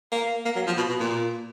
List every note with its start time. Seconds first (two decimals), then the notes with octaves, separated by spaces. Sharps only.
0.12 A#3
0.45 A#3
0.56 F#3
0.67 F3
0.77 B2
0.89 B2
1.00 A#2